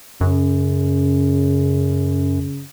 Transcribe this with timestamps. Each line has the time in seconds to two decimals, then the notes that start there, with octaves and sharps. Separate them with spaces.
0.21 F#2 C#3